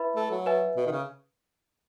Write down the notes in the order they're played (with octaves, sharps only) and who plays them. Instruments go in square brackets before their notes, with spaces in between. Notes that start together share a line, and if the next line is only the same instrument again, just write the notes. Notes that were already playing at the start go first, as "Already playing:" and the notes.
Already playing: [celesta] E4 B4 E5 B5
[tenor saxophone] A3
F#3
[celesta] B4 E5 G#5
[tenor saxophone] B2
D#3
C#3